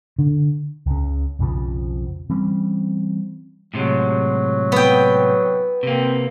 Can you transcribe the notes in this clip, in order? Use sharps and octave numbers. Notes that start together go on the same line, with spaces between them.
D3
C#2 C#3
B1 F2 C#3 F3
E3 G3 C4 C#4
A2 C3 F#3 G#3
B3 G5
C3 A#3 C4